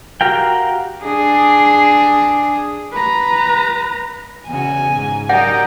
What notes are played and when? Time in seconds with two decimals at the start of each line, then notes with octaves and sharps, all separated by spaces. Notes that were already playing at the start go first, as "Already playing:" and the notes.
0.21 F#4 G4 A#4 F5 G5
1.04 D4 G#4
2.93 B4 A#5
4.48 E2 C#3 F#4 G#5
4.95 G#2
5.29 F#3 D#4 G4 A#4 D5 F#5